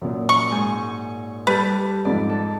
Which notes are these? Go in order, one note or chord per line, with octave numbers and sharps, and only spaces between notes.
F#2 A#2
C#6
G#2 G#5
G3 G4 A4 B4
F2 G#2 F3 D5
A4